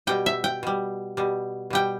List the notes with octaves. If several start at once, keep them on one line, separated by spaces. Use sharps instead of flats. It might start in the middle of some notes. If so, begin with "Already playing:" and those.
B2 G3 G5
E5
G5
B2 G3
B2 G3
B2 G3 G5